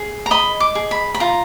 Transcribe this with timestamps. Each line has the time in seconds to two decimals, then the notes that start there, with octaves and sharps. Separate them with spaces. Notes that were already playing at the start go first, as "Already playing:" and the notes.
Already playing: G#4
0.26 A#5
0.31 D#5 B5
0.60 D6
0.75 G#4
0.91 B5
1.14 B5
1.20 F4 A#5